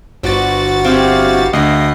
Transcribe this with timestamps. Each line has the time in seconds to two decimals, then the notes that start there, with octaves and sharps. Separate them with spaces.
0.23 G1 F#4 B4 C5 D5 A6
0.84 C4 E4 G4 G#4 F5
1.53 D2 A3 G#4 D#5 F5 C7